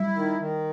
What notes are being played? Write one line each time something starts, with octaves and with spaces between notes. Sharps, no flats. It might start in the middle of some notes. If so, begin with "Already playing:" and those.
Already playing: G3 E4
D#3
D#3